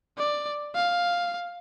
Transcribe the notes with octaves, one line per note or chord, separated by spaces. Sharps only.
D5
F5